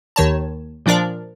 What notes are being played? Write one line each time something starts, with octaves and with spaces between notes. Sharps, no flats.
D#2 D#3 C#5 A5
A#2 F3 D4 A#4 D5